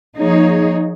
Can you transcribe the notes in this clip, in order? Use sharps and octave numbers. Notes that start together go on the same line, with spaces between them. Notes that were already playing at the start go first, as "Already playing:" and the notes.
F3 A#3 D#4 G#4 C#5